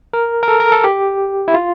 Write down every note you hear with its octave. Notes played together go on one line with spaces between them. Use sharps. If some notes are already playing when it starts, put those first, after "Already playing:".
A#4
A#4
A4
A#4
A4
G4
E4
F4